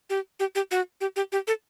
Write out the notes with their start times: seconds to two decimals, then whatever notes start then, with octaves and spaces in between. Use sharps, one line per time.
0.10 G4
0.40 G4
0.55 G4
0.71 F#4
1.01 G4
1.16 G4
1.32 G4
1.47 A4